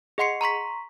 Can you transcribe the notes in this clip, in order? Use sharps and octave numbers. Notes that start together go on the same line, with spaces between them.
G#4 D#5 F#5 C6 C7 C#7
A#5 C6 C#6 B6